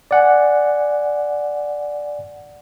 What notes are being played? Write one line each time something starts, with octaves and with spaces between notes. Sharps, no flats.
D5 F#5 G#5